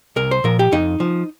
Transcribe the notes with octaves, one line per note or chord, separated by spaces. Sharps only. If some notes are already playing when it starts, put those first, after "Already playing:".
C2 A#4
C5
A#2 F3 A#4
G4
F2 D#4
F3